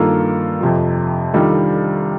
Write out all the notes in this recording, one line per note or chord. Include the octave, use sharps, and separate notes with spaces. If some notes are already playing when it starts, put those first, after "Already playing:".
Already playing: G2 D#3 A#3 F4 A4
F2 C3 F3
D#3 G3 D4 F4 A4